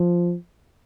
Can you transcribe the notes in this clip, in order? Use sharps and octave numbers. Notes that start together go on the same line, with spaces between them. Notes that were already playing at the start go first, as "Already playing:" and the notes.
Already playing: F3